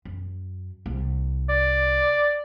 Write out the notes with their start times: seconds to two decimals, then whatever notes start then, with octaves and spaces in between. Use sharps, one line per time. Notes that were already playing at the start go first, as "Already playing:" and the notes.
0.05 F#2
0.86 C2
1.49 D5